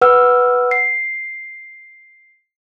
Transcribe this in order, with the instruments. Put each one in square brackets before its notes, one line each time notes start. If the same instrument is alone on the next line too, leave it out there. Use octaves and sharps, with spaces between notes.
[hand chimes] B4 F#5 E6 F6
C7